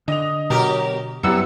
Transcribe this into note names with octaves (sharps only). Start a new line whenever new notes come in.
D3 D#5 D#6 F7
B2 F#3 G4 A#4
F#2 C3 F#3 G3 B3 E4 E6 C#7